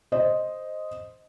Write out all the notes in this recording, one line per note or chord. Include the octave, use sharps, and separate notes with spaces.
C5 D#5